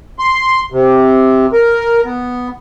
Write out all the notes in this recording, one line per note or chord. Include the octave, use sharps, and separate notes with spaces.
C6
C3
A#4
B3